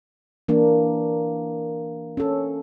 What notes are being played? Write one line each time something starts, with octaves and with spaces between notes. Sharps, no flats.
E3 A#3 D4
C#4 A4